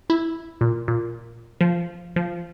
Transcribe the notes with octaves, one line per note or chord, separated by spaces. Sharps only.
E4
A#2
A#2
F3
F3